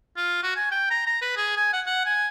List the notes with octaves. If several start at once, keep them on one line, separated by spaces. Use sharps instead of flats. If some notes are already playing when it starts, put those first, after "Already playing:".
F4
F#4
G#5
G5
A#5
A#5
B4
G#4
G#5
F#5
F#5
G#5